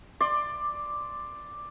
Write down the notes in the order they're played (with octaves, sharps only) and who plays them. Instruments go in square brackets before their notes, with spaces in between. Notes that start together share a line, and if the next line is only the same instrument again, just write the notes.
[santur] D5 C6 D6